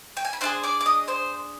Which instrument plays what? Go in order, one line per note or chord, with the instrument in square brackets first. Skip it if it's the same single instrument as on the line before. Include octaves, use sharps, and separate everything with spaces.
[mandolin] G5
G#5
B5
D4 F4 G#4 C5 C6
D5 D6
D6
D#5 D#6
C5 C6